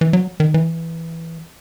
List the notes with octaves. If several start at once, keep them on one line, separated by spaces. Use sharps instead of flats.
E3
F#3
D#3
E3